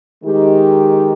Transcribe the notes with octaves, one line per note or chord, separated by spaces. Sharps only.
D#3 G#3 D#4 G4